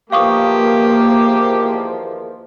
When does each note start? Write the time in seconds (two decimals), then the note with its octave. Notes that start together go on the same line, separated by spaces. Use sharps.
0.12 E2 D#3 F3 A#3 G4 F5 C#6 D#6